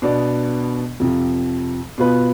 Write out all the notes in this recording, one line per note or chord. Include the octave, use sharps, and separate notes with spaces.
B2 B3 D4
F2 C3 F3
B2 B3 F4 B4